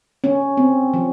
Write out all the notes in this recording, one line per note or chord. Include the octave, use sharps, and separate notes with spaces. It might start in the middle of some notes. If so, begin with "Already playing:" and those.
C#4
C4
F3